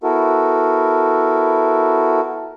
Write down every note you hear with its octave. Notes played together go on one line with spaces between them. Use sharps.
B3 E4 F#4 A4 A#4